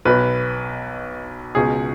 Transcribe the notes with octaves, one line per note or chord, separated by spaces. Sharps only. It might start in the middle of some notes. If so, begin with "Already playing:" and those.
B1 B2 B4
C#2 B2 G#4